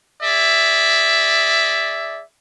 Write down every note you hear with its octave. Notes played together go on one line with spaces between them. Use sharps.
G#4 D5 E5